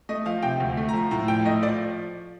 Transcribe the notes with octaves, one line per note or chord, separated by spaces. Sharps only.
A3 D#5
F3 F5
C3 G5
D2
A3
A#5
F3
A2 A#5
A#1 G5
A3 D#5
F3 D5